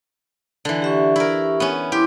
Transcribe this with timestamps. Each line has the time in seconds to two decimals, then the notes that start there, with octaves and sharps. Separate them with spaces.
0.65 D3 E3
0.82 G4 E5 C#6
1.16 E4 A#4
1.60 B3 C#4
1.92 E4 G4 C6 D6